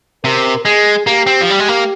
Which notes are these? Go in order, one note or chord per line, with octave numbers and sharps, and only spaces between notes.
C3 A#4
G#3 G#4
A#3 G4
C4
F3
G3
G#3
A#3